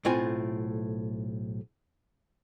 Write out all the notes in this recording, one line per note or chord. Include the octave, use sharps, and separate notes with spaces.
B1 A2 A3 C4 F4 G#5